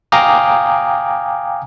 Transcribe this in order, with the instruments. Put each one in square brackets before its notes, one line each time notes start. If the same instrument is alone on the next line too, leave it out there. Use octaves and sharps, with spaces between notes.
[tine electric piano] F5 G5 G#5 A#5 D6 D#6